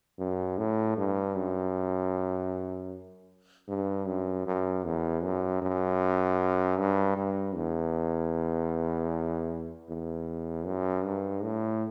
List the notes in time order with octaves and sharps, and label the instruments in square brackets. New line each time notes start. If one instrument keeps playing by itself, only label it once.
[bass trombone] F#2
A2
G2
F#2
G2
F#2
F#2
E2
F#2
F#2
G2
G2
E2
E2
F#2
G2
A2